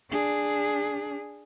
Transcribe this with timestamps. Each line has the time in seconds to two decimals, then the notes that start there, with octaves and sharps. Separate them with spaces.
0.11 D4 G#4